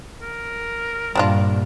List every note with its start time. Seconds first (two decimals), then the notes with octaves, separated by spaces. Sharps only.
0.22 A#4
1.15 G2 A#2 G3 D4 F4